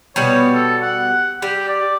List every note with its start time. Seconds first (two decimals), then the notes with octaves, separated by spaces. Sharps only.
0.16 B2 G3 B3 C#5
0.54 A4
0.82 F#5
1.42 G3 G4
1.68 D5